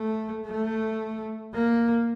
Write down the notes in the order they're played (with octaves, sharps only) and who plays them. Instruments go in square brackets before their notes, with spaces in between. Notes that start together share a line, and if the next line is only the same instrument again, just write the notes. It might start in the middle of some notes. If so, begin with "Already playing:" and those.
Already playing: [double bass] A3
A3
A#3